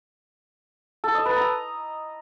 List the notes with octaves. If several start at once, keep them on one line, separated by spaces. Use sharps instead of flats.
A4
D#5
B4
A#5